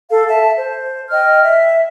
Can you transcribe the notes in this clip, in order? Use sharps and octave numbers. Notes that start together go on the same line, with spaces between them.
A4 F5
E5 A5
C5
D#5 G5 F6
E5